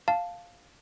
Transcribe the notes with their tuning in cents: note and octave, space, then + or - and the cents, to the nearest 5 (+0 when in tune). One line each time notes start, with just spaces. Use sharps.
F5 +5 A5 +0